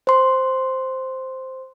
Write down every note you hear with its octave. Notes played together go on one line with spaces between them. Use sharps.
C5 C6